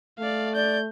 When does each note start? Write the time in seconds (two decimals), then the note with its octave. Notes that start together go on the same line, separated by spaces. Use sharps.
0.19 A3 D5 F5
0.55 D5 G6